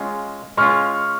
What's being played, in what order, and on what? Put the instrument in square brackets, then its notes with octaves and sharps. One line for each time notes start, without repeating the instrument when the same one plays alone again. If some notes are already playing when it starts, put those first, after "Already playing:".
Already playing: [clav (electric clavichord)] G#3 C#4 F4
[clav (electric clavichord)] G#3 C#4 F4 [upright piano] C#6 F6